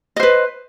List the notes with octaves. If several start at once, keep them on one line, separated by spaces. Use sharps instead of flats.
B4 C5 D#5